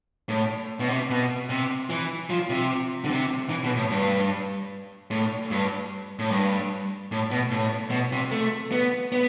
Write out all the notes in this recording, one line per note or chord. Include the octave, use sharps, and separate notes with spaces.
A2
B2
C3
B2
C3
E3
F3
C3
D3
C3
E3
B2
A2
G2
A2
G2
A2
G2
A2
B2
A2
B2
C3
A3
B3
B3